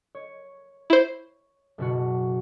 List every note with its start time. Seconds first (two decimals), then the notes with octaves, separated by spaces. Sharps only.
0.15 C#5
0.90 E4 C5
1.78 F#1 B2 F#4